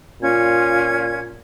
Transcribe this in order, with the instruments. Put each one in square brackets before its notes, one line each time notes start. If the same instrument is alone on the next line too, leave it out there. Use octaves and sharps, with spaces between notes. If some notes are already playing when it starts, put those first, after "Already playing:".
[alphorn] A#2 [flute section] C#4 F4 G#6